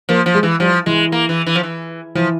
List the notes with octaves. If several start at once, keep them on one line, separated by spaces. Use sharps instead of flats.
F3 A#3
F3
G#3
E3
F3 G3
E3 G#3
A#3
E3
E3
F3
E3
E3 F3